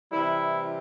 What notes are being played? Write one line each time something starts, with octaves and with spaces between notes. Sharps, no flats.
C3 E3 G3 E4